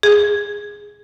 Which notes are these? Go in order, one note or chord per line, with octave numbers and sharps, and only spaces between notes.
G#4